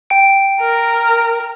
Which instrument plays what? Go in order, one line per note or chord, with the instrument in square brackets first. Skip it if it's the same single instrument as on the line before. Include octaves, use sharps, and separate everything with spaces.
[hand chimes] G5 D7
[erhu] A#4